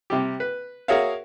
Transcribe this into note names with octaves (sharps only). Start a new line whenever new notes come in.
C3 G3 G4
B4
F#4 G#4 A#4 C#5 E5 F5